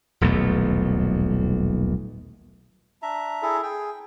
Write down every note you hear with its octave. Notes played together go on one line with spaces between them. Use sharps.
D#1 B1 E2 A3
D4 E5 A#5
E4 G#4 A4
G#4 G5